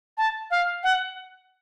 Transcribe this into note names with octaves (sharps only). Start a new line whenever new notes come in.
A5
F5
F#5